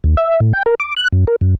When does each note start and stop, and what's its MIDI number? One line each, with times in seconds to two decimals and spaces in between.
0.04 0.15 39
0.17 0.40 76
0.40 0.53 45
0.53 0.63 79
0.66 0.75 70
0.80 0.94 86
0.97 1.08 90
1.13 1.25 42
1.27 1.36 70
1.41 1.55 42